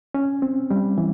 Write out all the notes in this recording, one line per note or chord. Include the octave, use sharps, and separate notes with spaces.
C#4
C4
G3
E3